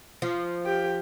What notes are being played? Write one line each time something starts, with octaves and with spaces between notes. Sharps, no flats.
F3
G4